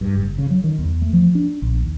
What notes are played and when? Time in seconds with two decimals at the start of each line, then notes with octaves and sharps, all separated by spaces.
0.01 G2
0.17 F#1
0.38 C#3
0.50 F#3
0.64 D#3
0.79 E2
1.02 A3
1.13 F3
1.35 D4
1.62 A#1
1.82 D#2